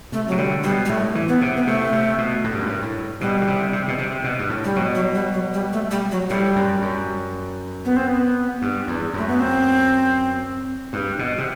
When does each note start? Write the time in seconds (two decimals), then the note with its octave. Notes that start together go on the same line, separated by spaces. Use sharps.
0.12 C3 A3
0.28 C3 F#3
0.38 D3 G3
0.64 B2 G3
0.85 G3
0.89 A2 A3
1.15 E3
1.28 B3
1.41 C3
1.56 B3
1.67 C3 A3
1.92 C3
2.18 B2
2.44 A2
2.51 G2
2.59 F#2
2.66 G2
2.82 A2
3.21 B2 G3
3.42 D3
3.47 C3
3.73 C3
3.88 B2
3.98 C3
4.24 B2
4.39 G2
4.50 A2
4.64 G3
4.76 B2 F#3
4.95 F#3
5.15 G3
5.33 F#3
5.54 G3
5.73 A3
5.91 G3
6.11 F#3
6.30 A2 G3
6.56 F#2
6.82 F#2
7.85 B3
7.96 C4
8.07 B3
8.62 G2
8.87 E2
9.13 F#2 A3
9.28 B3
9.39 C4
10.93 G2
11.19 B2
11.38 C3